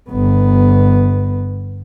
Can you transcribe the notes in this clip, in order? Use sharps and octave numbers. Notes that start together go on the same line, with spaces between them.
G1 B3